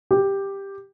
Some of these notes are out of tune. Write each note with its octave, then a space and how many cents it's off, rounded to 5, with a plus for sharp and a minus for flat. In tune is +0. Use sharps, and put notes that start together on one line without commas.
G4 +5